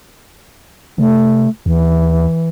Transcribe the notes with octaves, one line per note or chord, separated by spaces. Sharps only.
C3 A3
D#2 E3